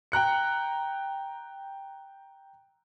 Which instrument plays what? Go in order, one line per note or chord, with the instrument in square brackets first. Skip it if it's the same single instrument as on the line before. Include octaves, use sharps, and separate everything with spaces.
[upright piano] G5 A#5 F#6 C#7